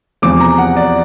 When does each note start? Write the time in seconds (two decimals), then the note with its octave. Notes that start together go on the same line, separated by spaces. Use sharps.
0.22 E2 C3 F3 D6
0.40 A#5
0.58 F#5
0.76 D5